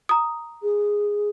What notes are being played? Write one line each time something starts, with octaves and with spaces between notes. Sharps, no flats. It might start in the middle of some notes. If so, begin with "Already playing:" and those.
A#5 D#6
G#4